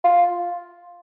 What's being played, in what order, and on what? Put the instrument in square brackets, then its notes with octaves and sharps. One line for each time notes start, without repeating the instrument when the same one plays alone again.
[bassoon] F4